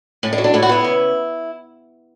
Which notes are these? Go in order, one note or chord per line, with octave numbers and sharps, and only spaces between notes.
A2 C#4
D4
F#3
D4
A2 E4
F#4
B3 E4
C#3